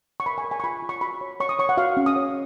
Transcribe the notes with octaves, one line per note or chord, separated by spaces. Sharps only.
C#6
A#4 B5
G#5
A#4
G#5
C#6
F4 B5
F4
C#6
F#4 B5
C#5
C#5 C#6
D#6
C#5 C#6
F#5
F#4 F5
C#4
D#6
C#5